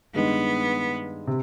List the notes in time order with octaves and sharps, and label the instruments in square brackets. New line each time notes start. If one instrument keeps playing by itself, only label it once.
[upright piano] G2 D#3 G#3 [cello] B3
[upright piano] C3